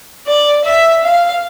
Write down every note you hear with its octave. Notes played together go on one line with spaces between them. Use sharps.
D5
E5
F5